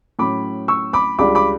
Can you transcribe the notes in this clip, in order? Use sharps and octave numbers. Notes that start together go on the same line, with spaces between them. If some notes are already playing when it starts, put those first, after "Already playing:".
A2 F#3 C#4 B5 D6
C#6 E6
B5 D6
C#2 C#3 G3 D4 B5 D6
B5 D6